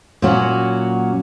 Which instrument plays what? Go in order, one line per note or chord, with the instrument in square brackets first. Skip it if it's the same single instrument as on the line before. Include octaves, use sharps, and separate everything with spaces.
[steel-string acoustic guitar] A#2 F#3 C#4 F#4